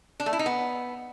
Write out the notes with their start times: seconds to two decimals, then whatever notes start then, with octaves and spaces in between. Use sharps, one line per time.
0.20 D4
0.26 A3
0.33 E4
0.39 D#4
0.46 B3